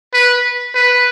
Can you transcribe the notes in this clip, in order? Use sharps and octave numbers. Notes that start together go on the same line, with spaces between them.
B4
B4